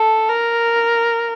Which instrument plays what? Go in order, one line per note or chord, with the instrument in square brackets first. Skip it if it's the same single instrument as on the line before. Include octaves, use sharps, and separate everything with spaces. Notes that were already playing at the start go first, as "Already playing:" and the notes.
Already playing: [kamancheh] A4
A#4